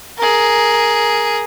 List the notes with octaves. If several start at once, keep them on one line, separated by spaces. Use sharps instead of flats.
G#4 A#4